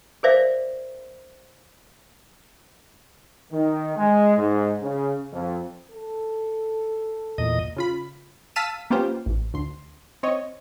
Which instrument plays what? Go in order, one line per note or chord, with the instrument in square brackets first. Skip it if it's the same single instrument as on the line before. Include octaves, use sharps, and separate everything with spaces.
[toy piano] G#4 A#4 C5 D5 E5 F5
[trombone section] D#3
G#3
G#2
C#3
F2
[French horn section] A4
[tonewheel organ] E2 A#2 D#5
[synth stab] C#3 F4 B5
F5 A5 E6 B6 D#7 E7
A#3 B3 C#4 F4 G4 C5
A1
D2 C6
C4 C#5 D#5